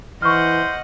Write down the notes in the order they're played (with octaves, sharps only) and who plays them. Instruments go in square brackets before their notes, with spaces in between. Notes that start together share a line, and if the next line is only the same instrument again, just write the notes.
[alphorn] E3 [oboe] C5 [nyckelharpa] D#5 F#5 [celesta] C#6 F6